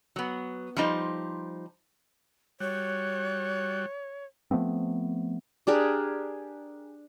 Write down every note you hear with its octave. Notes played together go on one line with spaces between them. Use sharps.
F#3 B3
F3 G3 D#4 C5
G3 F#4 C#5
F3 A3 B3 C4
D4 G4 G#4 A#4